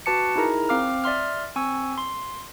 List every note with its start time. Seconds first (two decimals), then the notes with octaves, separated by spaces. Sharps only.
0.06 F#4 B4 A5 D6 C#7
0.36 D#4 E4 G#4 A#4 A#5
0.69 C4 F5 D6 F6
1.04 D5 E5 C6 F6
1.56 C4 G#5 C#6 E6
1.98 C6